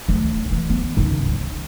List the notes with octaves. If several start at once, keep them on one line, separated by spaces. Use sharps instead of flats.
D2
E3
B3
C#2 D#3
E3